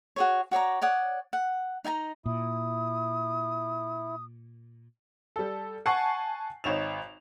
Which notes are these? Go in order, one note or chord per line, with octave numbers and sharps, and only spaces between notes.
F#4 G#4 C#5
F#4 C#5 D5 A#5
C#5 D5 F#5 D#6
F#5
D#4 D#5 G#5 A#5
A#2 E4 D#6
G3 A4
F#5 G#5 A5 C#6 C7
G#1 D#4 C#5 E7 F7